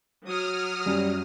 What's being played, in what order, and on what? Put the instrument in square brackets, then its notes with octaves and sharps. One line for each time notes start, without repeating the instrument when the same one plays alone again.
[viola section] F#3 [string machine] D#6 F6
[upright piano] F#2 [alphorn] G3